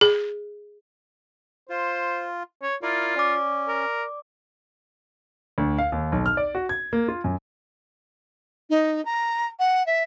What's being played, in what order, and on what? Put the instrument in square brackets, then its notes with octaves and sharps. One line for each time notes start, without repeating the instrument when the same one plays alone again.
[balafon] G#4
[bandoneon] F4 [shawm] C5
[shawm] C#5
[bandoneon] E4 A#4 D5 [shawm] F4
[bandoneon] C#4 [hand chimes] D5 D6
[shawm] A#4
[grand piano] D2
F5
D#2
B1
F6
D5
F#4
G#6
A#3
F4
F#2
[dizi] D#4
A#5
F#5
E5